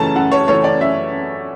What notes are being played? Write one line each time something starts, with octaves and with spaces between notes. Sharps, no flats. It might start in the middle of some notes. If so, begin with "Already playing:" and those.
Already playing: F#2 C#3 E3 A3 C#4 A5 A#5
F#2 F#5
C#5
C#3 E3 A3 C#4 C#5
D5
F#2 E5